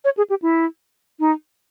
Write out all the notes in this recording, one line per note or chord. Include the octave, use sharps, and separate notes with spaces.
C#5
G#4
G4
E4
D#4